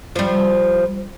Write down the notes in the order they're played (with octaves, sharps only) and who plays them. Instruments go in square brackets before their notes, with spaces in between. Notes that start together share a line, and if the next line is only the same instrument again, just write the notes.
[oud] F3 G3